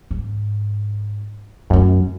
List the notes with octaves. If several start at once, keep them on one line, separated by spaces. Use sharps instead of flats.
G#2
F#2 A3 C#4